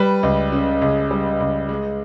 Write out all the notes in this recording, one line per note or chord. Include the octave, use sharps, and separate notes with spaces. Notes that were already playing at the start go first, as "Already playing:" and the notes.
Already playing: G3 B4
C#2
C#3
C#2 G#4
G3
C#2
G#3